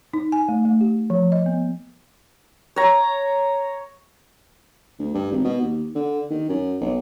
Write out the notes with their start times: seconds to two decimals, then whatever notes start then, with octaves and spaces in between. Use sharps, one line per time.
0.13 D#4
0.32 G#5
0.49 A3
0.65 A3
0.81 G4
1.10 F3
1.32 D#5
1.46 B3
2.76 C#5 A#5
4.99 D2
5.14 G2
5.32 G#1
5.44 B2
5.61 D#2
5.95 D3
6.30 D#3
6.49 F#2
6.81 B1